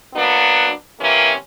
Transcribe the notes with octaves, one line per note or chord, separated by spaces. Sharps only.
F#3 A#3 B3 D4
C3 E3 A#3 C#4